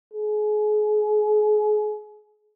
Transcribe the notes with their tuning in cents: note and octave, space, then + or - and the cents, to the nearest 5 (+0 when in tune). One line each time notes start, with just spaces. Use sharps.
G#4 +35